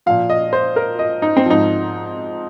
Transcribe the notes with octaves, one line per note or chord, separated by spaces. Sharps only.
A#2 F3 F5
D#5
C5
A#4
D#5
D#4
C4
G#2 F3 D#4